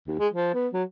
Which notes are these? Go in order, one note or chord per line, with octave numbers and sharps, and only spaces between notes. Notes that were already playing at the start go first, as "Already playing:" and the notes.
D#2
G#3
F3
B3
F#3